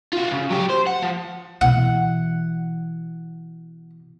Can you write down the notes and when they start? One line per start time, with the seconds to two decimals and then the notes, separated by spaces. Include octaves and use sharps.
0.13 F4 F#4
0.31 C#3
0.50 F#3 G4
0.69 C5
0.87 F#5
1.03 F3
1.61 B2 E3 F#5